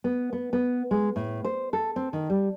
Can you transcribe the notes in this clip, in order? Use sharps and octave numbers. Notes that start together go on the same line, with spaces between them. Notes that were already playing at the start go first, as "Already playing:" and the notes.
B3
B3
B3
G#3
A2
C5
A4
C4
D#3
G3